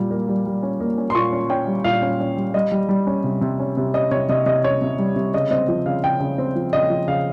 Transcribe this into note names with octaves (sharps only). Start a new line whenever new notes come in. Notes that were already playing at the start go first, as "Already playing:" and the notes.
Already playing: A#2 G3
A#3
G3
G3
C#4
A#3
C#4
C6
A#2 C#6
C#4
C#4 G5
G3
A#2 F5
C#4
C#4
G3
G3 D#5
G3
G3
C#4
C3
C3
C#4
C3
C#4 D#5
C3 C#5
C3 D#5
C3 D#5
C#4 C#5
C3
G3
C3
C#3 D#5
C4 D#5
F3
C#3 F5
C#3 G5
C#3
C4
F3
C#3 D#5
F3
C#3 F5